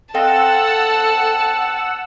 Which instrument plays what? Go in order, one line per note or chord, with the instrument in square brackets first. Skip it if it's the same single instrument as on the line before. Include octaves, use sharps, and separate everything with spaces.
[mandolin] C4 D#5 F5 [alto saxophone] A4 [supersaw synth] F#5 E6 [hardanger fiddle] A5